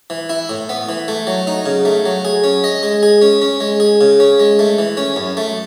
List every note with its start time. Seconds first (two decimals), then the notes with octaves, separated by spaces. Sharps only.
0.10 E3
0.29 E4
0.49 A2
0.69 B3
0.89 E3
1.08 A3
1.27 F#3
1.47 D#4
1.66 C#3
1.85 A3
2.06 F#3
2.25 G#4
2.44 C#4
2.64 D#5
2.83 G#3
3.03 G#4
3.22 C#4
3.42 C#4
3.61 G#3
3.80 G#4
4.01 C#3
4.20 C#4
4.40 G#3
4.59 A3
4.79 E3
4.97 C#4
5.16 F#2
5.37 A3